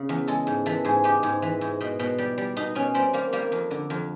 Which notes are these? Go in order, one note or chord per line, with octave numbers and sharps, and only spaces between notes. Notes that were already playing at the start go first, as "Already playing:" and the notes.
Already playing: C#3
E2
G#3 A4
G#2
E3 A4
G#2 G#4
G#3 G4
G#2
E3
G#2
B2
B2
G3
G3
B2 D#4
B2 C#4
G3 C4
G3 A#3
G3 A#3
F2
D3
F2